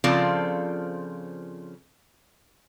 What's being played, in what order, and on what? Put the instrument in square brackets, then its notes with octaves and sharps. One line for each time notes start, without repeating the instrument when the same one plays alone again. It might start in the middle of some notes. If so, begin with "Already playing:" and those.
[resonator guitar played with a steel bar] C#3 F3 C4 F4 A4 D5